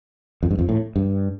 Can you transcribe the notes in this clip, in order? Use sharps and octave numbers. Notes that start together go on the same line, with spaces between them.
F2
G2
F2
A2
G2